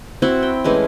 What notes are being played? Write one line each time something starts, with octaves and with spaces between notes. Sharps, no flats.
C4 E4 F#4 F#5
G5
E3 G#3 A3 C#4